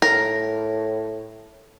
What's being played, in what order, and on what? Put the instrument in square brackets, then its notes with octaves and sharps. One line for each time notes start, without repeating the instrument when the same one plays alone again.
[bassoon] A2 [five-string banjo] A#4